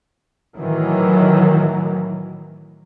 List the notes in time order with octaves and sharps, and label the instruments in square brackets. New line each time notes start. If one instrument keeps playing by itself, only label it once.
[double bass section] A2 D#3 E3 F#3